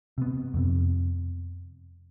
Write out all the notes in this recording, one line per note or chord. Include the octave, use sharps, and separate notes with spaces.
C3 B3
F2 C3